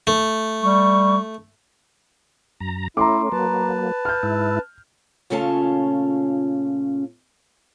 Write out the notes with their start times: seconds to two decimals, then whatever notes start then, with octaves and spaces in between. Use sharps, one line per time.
0.07 A3
0.63 G3 C#6
2.60 F#2 A#5
2.97 A3 C#4 E4 A#5 C6 D6
3.32 F#3 A#3 B4 A5
4.05 F6 G6
4.23 G#2 E4
5.30 A#2 C#3 A3 C#4 F4 A5